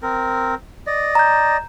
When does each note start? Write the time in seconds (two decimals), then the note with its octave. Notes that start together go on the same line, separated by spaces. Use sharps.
0.03 C4 A#4
0.87 D5 D#5
1.15 A#5 G6